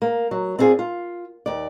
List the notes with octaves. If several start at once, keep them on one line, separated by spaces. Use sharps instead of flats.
A#3
F#3
C4 E4 F4 G#4 D5
F4
D#2 D5